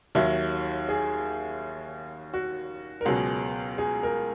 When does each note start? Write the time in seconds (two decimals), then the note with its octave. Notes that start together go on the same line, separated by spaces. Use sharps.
0.15 D#2 D#3 F#3 E5
0.89 G#4
2.34 F#4
3.01 A#4
3.05 C#2 B2 F#3 G#4
3.78 G#4
4.03 A#4